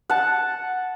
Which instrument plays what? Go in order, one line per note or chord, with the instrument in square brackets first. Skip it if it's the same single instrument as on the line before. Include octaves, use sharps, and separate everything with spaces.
[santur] F#5 A5